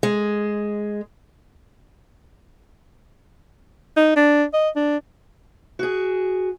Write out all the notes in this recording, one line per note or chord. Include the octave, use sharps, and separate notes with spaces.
G#3
D#4
D4
D#5
D4
F#4 G#4